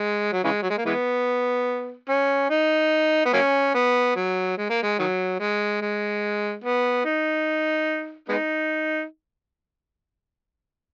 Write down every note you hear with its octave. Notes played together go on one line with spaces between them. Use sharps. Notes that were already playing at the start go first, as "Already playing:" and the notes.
Already playing: G#3
F#3
C#3 E3 G#3
F#3
G#3
A#3
E3 G#3 B3
C#4
D#4
B3
F#3 A#3 C#4
B3
F#3
G#3
A#3
G#3
D#3 F#3
G#3
G#3
B3
D#4
G#3 B3 D#4